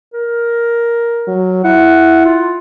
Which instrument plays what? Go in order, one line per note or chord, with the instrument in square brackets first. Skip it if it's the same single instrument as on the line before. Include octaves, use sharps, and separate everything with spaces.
[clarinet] A#4
[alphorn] F#3
[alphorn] E4 [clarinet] F#5
[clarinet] F4